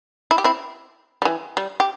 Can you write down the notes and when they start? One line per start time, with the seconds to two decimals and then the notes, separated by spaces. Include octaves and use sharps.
0.31 E4
0.38 G4
0.44 C4 E4
1.22 G3
1.25 E3
1.57 G3
1.80 G4